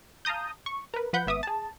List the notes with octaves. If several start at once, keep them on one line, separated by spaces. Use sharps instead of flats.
F5 A5 A#5 D#6 G6
C#6
A#4 B4
F3 B4 F#5 B5 G6
G#1 B3 E5 D6 D#6
G#4 A5